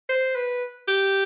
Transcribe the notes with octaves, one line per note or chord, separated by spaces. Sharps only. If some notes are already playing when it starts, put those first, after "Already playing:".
C5
B4
G4